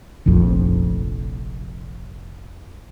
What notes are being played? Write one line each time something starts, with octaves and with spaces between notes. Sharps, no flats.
F1 A#1 F2